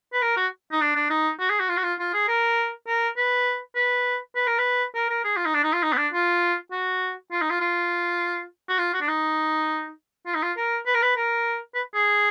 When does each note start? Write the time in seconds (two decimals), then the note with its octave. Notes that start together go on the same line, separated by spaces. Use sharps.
0.13 B4
0.22 A#4
0.37 F#4
0.72 D#4
0.81 D4
0.95 D4
1.10 D#4
1.40 F#4
1.50 G#4
1.60 F#4
1.69 F4
1.77 F#4
1.83 F4
1.99 F4
2.14 G#4
2.28 A#4
2.88 A#4
3.17 B4
3.76 B4
4.36 B4
4.47 A#4
4.59 B4
4.95 A#4
5.10 A#4
5.24 G#4
5.37 F4
5.45 D#4
5.54 D4
5.64 D#4
5.73 F4
5.83 D#4
5.93 B3
5.98 D4
6.13 F4
6.72 F#4
7.32 F4
7.41 D#4
7.50 F4
7.61 F4
8.69 F#4
8.79 F4
8.94 F#4
9.01 D4
9.08 D#4
10.26 F4
10.35 D#4
10.43 F4
10.57 A#4
10.86 B4
10.95 A#4
11.02 B4
11.16 A#4
11.75 B4
11.95 G#4